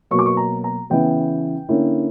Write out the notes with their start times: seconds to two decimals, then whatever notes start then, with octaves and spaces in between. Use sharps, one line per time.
0.11 B2 F#3 A#3 C#6
0.19 D6
0.26 C#6
0.37 A#5
0.64 A#5
0.90 C#3 E3 B3 E4 G5
1.69 D3 A#3 C#4 E4